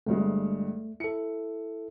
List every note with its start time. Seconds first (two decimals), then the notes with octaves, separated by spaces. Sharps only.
0.06 G1 G2 G#3 A3
1.00 E4 A4 C#7